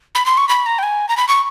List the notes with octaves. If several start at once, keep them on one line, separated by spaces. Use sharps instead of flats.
B5
C6
C#6
B5
A#5
G5
G#5
A#5
B5
C#6